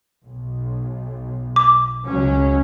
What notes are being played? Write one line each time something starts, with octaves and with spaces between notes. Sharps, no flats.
B1
D6
C#2 F#3 C#4